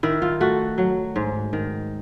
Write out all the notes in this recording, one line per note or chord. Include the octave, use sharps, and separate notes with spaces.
D#3 E4
F4
A3 F#4
F#3
G#2
D#3